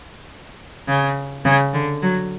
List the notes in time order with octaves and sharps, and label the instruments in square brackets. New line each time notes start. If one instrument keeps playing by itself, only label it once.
[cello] C#3
C#3
D3
F#3